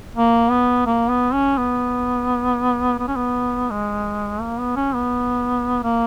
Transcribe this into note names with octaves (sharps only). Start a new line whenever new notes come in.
A#3
B3
A#3
B3
C#4
B3
B3
C#4
B3
G#3
A#3
B3
C#4
B3
A#3